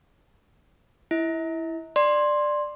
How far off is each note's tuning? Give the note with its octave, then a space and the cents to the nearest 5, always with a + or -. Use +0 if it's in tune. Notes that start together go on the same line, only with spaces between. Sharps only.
E4 +0 E5 -45
D5 +10 C6 +10